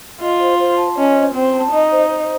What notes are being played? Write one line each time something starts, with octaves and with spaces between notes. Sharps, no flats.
F4 D#5
C5
C5
A5
C#4 D#5
C5
C4 C5
A5
D#4 D#5
C5
C5